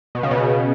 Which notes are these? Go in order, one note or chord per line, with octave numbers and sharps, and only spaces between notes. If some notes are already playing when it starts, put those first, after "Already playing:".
B2
C#3
B2